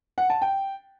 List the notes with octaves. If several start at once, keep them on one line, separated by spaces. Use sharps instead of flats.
F#5
A5
G5